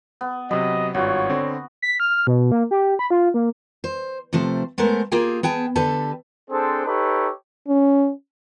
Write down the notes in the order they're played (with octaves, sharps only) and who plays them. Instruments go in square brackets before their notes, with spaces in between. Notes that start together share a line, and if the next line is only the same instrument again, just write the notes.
[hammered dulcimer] B3
[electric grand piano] C3 F#3 [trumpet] D#5 [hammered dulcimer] B5
[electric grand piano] G#1 G2 F4 [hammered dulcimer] F#4 [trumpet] C#5
[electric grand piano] D3 C4
[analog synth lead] B6
F6
B2
A#3
G4
B5
F4
A#3
[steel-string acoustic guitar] C5
C3 F3 A3 C5
G#3 A3 B3 A#4 C5
A#3 F4 G4 G#4 G5
B3 G#4 G5 A5
D3 G4 A4 B4 A5
[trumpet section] C4 D4 G#4 A4 C5
D#4 G4 A4 B4 C#5
[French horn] C#4